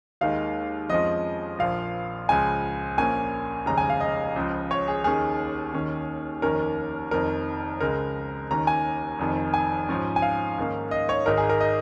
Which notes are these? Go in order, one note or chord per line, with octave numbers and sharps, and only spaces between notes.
D#2 D#3 G#3 F5
F2 F3 G#3 C#4 D#5
A#1 A#2 F3 F5
C#2 C#3 F3 G#3 G#5
A#1 A#2 A#3 C#4 G#5
F1 D#2 C#3 G#3 A#5
G#5
F5
D#5
C#2 C#3 F3
C#5
G#4
D#2 D#3 C#4 G#4
D#2 D#3 C#4
F1 D#2 D#3 C#4 A#4
F1 F2 D#3 A#4
C#2 C#3 G#3 A#4
D#2 D#3 C#4 A#5
G#5
F1 F2 D#3
G#5
G#2 F3 C#4
G#5
F5
G#2 D#3 A#3 C#4
D#5
C#5
G#1 G#2 G#3 D#4 A#4
G#4
A#4
D#5